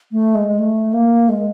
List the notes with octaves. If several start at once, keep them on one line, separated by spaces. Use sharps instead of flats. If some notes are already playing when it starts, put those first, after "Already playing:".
A3
G#3
G#3
A3
A#3
G#3